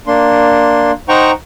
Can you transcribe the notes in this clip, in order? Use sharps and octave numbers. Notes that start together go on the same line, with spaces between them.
A#3 D4 C6
D#4 C5 F#5 G5 A#5 C#6